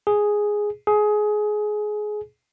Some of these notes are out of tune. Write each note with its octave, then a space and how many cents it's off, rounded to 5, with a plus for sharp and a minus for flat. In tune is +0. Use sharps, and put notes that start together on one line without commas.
G#4 +0
G#4 +20